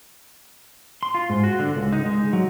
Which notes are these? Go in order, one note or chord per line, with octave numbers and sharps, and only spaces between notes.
C6
F4
G#2
F#4
D3
C#2
D#4
G#3
F#3